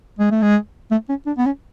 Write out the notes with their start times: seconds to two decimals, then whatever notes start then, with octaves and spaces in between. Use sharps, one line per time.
0.19 G#3
0.31 A3
0.42 G#3
0.91 A3
1.09 C#4
1.27 D4
1.38 B3
1.46 C#4